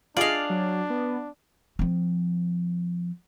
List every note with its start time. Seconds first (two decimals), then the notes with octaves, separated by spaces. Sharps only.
0.17 D4 F4 G#4 D5 D#5 F5
0.50 F#3
0.90 B3
1.79 F3 C4